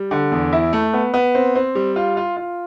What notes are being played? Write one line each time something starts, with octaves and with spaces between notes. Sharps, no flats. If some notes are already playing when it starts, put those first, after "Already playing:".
Already playing: G3
D3
E2
E4
A3
B3
B3
C4
C4
G3
F4
F4
F4